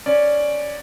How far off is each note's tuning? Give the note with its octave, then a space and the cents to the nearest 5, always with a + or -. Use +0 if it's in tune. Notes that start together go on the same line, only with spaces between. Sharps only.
C#4 +0 D5 +0